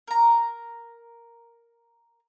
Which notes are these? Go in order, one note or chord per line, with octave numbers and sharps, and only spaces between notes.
A#4 A#5